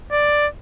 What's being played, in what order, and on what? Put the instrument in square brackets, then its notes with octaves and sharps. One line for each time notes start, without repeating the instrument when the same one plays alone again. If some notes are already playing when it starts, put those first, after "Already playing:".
[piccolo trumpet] D5